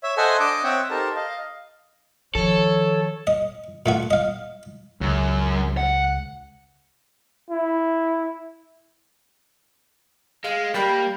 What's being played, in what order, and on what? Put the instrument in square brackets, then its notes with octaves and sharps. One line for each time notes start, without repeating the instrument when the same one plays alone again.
[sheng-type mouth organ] C#5 E5
A4 C5 D#5 E5 F#5 G#5
D4 D#5 D6 D#6
C4 C#5 E5 F#5 G5
D#4 G4 A4 A#4 C5 A5
D#5 F5
[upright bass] D#3 F3 [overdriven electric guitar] A4 [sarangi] C#5
[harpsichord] D#5
A#2 A3 F#4
D#5 F5
[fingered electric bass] C#2 [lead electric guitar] F#2
[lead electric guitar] F#5
[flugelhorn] E4
[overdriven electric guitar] G#3 [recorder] F5
[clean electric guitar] G3 [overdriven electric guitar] A#3 [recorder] B5